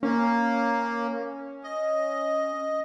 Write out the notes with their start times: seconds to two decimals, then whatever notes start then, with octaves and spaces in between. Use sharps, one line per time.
0.03 A#3 C#4
1.64 D#5